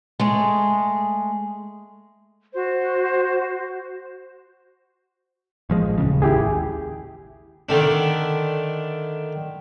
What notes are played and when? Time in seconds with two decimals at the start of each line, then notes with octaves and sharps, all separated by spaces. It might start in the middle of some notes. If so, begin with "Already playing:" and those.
0.20 G#3 A3 G#4
2.54 F#4 C5
5.70 A1 F3 G#3
5.98 D#1 C#2 C#3
6.22 A1 D#2 E4 G4 G#4
7.69 D3 D#3 A3 D4